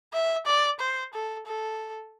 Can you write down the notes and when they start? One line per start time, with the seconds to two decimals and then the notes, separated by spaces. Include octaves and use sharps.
0.13 E5
0.46 D5
0.80 C5
1.14 A4
1.46 A4